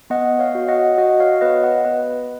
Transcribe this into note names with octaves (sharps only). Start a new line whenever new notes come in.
B3 D#5 F#5
C#5 F5
F#4
D#5 F#5
F#4 D#5 F#5
C#5 F5
B3 B4 D#5
D#5 F#5
B3 B4